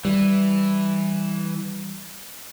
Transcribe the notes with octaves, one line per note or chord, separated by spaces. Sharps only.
E3 G3